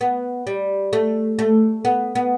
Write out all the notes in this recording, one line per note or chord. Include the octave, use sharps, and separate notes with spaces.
B3
G3
A3
A3
B3
B3